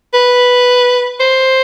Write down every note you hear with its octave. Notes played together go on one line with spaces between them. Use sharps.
B4
C5